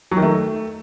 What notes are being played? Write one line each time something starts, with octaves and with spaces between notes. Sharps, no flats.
F#3
D#3
A3